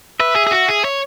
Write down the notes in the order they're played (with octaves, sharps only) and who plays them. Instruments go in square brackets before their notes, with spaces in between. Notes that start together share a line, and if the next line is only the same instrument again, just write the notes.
[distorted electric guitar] B4 [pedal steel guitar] E5
[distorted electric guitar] G#4
G#4
F#4
G#4
C#5